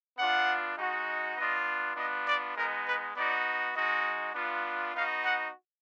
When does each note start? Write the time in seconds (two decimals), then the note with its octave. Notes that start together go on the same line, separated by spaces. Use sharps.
0.17 B3 D4 F4 F#5
0.76 G#3 D#4 F#4
1.36 B3 D4 F4 D#5
1.95 B3 D4 F4 D#5
2.26 D5
2.55 G#3 B3 D#4 A#4
2.86 B4
3.15 B3 D#4 F#4 D5
3.74 G#3 D#4 F#4 D#5
4.34 B3 D4 F4
4.93 B3 D#4 F#4 F5
5.23 F#5